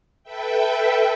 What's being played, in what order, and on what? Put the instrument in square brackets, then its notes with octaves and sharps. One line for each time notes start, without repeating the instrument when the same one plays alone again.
[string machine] A4 B4 E5 G5